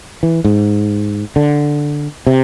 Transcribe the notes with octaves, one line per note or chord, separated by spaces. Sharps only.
E3
G#2
D3
C3